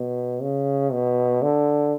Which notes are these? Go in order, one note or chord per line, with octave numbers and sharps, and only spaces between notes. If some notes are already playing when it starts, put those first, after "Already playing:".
Already playing: B2
C#3
B2
D3